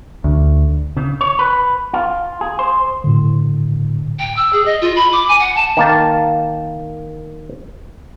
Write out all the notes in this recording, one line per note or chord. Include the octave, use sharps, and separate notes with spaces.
D2
C#3
C#5
B4
F4
G#4
C5
A2 D3
G5
E6
G#4
D#5
F4
B5
D6
G#5
F#5
A5
D#3 A#3 A5